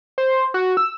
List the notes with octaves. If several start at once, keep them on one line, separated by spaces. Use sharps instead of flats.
C5
F#4
E6